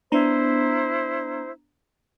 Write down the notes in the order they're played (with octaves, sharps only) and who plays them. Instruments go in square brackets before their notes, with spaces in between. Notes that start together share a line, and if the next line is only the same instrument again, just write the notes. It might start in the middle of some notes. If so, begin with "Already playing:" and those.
[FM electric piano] B3 D4 A#5 [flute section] E4 C5